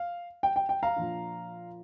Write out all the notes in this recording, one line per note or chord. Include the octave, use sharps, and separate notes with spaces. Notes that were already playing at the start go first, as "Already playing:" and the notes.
Already playing: F5
G5
G5
G5
F5 A#5
A#2 F3 D4 F4